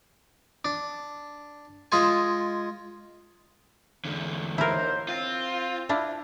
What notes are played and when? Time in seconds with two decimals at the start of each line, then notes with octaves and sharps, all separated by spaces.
0.65 D4
1.92 G#3 F4 G#5
4.05 E2 D3
4.58 D#2 E4 A#4 C5
5.08 C4 F4
5.89 D4 E4 F4